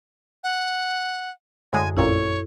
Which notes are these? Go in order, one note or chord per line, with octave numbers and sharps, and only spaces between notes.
F#5
F#2 A2 D3 G#3 G#5
A1 F2 A#2 E4 A4 C#5